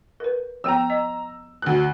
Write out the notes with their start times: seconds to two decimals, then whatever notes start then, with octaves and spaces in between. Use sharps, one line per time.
0.20 A#4 B4
0.64 F3 B3 G5 A#5 E6
0.90 D#5
1.62 D2 F#6